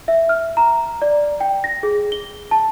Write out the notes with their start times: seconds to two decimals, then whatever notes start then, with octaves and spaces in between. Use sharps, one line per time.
0.08 E5
0.29 F6
0.57 A#5
1.02 D5
1.40 G5
1.64 A#6
1.83 G#4
2.12 G7
2.51 A5